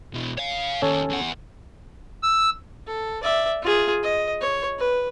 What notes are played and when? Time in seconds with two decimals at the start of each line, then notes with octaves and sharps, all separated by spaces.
0.13 B2 E3
0.38 C#5 F5
0.82 D#2 C#4 A4 C#5
1.10 E2 F#5
2.23 E6
2.87 A4
3.23 D5 E5
3.63 F4 G#4
4.03 D#5
4.41 C#5
4.79 B4